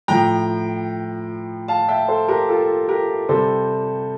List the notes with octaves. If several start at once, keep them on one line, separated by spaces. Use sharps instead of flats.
A2 F3 G5 A#5
F5 A5
E5 G5
A4 C5
G4 A#4
F4 A4
G4 A#4
C3 G3 A4 C5